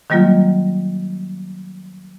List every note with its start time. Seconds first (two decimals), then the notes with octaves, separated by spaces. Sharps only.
0.10 D#3 F#3 G3 A#3 F4